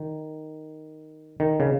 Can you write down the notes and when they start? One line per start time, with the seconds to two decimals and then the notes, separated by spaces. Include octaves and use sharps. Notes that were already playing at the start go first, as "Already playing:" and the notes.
Already playing: D#3
1.40 D#3
1.60 C#3